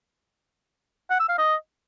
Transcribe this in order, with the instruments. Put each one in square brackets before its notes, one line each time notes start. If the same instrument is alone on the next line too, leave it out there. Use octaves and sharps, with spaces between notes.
[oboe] F#5
E6
F5
D#5